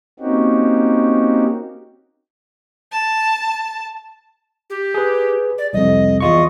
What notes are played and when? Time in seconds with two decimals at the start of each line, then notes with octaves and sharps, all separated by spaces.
0.20 A#3 C4 C#4 D#4 F#4 G4
2.91 A5
4.70 G4
4.94 G#4 B4
5.58 D5
5.73 C2 F2 D#5
6.20 E2 F4 D#5 C#6